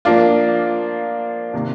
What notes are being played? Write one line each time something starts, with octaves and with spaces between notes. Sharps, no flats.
F3 A#3 D4 F4
C3 D#3 A#3